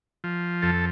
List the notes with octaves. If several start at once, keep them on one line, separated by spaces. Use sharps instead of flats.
F3
F2 A4